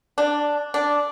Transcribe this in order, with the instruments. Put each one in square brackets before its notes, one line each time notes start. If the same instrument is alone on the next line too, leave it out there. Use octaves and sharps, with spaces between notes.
[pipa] D4
D4